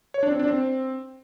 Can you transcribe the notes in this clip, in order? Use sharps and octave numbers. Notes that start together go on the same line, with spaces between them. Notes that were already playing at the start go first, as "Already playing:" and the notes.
C#5
D4
C4
D4
C4